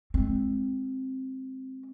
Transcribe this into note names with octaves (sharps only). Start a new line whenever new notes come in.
G#3 C4